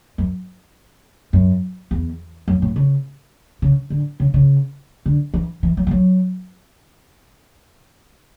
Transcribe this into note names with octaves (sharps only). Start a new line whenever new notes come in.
F#2
F#2
E2
F#2
A2
C#3
C#3
D3
C#3
C#3
D3
E3
E3
F#3
E3
F#3